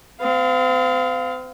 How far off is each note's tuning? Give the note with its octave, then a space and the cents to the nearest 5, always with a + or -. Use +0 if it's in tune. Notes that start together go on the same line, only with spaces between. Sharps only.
C4 -40 F5 +0